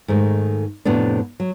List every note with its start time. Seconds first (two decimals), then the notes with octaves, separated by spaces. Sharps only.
0.08 G#2 D#3 A3
0.85 F2 A2 C3 B3 D4
1.40 F#3